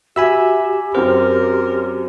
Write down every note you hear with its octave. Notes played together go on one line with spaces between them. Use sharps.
F#4 G4 E5 G#5 B5 E6
F#2 C4 A#4 C5 F6